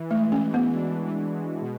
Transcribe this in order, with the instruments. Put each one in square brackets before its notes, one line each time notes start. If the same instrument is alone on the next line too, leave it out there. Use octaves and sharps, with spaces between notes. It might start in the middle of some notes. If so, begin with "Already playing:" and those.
Already playing: [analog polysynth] E3
[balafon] A3
[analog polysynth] G#3
[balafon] C#4
[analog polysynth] F#4
[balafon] B3
[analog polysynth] D4
E3
G#3
B2